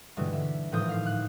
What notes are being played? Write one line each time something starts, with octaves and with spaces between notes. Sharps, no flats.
G2 B2 D3 E3 G#3 A3
E5
G#1 A2 E3 F3 D#6 G6
F5 C7
F#6